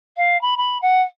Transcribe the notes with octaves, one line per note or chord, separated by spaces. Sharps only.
F5
B5
B5
F#5